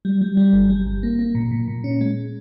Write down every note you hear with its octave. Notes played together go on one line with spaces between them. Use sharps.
G3
G3
G3
G1
G3
G1
A#3
A#3
A#2
A#2
A#2
C#4
G#3